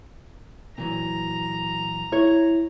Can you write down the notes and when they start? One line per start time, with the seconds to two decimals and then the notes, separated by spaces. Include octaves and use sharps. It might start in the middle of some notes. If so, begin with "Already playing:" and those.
0.78 A#2 E3 F#3 A#5
2.12 E4 C#5